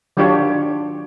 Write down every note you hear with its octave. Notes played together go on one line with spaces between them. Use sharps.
D#3 F#3 D4 F4 G4 C#5